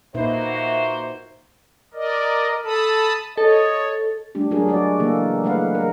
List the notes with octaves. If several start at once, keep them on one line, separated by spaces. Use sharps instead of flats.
A#2 A#3 D#4 F#4 B4 C5 E5
E5
A#4 D5 D#5
A4 A5 B5 D#6
A4 C#5 D#5
G3 A3 D4 G4
F#3 G#3 D4 F#4 G#4 A#4
G#3 F#4 D5
C#3 E3 A#3 A4
F#3 G#3 A3 B4 F5 F#5
E3 F#3 A#4